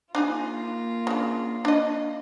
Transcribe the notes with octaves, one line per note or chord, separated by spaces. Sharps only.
A#3 D4 D#4 F4 G#4
C#3 D4
D4 D#5